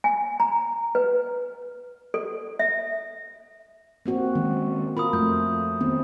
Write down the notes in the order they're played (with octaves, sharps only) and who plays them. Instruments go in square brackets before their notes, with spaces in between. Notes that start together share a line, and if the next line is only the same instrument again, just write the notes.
[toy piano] G#5
A#5
B4
A4
E5
[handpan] A#3 C4 F#4
[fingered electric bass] D#3 G#3 C#4
[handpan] F4 A#4 [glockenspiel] B5 D#6
[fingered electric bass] F2 [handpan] A3 [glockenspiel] G6
[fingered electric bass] D#3 B3 D4 [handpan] C4